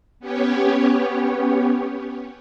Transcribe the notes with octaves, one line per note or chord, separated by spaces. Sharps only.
B3 C#4 G4 C#5